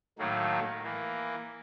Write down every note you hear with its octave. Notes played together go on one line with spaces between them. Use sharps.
A2 D#3 F#3 A3 A#3
E3 A#3